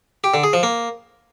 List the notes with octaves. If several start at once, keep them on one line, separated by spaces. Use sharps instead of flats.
G4
D3
G#4
F3
A#3